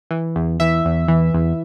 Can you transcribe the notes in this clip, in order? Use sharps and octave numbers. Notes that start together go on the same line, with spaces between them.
E3
E2
E3 E5
E2
E3
E2